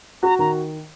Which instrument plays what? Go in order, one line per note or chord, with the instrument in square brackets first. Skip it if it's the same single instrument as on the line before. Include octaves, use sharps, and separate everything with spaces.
[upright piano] F#4 [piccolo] A#5
[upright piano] D#3 [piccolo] A#5